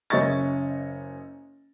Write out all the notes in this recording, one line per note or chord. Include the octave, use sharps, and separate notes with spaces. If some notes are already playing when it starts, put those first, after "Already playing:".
F#1 C#4 D#5 E5 C#6 A6